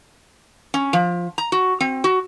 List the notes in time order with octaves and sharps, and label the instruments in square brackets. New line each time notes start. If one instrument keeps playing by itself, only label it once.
[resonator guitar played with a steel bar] C#4
F3
A#5
F#4
C4
F#4